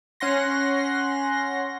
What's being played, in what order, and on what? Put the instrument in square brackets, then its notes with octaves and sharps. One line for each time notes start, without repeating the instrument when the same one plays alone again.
[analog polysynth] C#4 F#5 C6 A#6